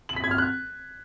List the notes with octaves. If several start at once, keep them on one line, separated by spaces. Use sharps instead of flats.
F#7
B6
G#6
F6
F#6